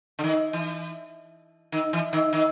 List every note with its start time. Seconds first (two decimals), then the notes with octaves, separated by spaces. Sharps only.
0.19 D3
0.24 D#3
0.53 E3
1.72 D#3
1.93 E3
2.13 D#3
2.33 D#3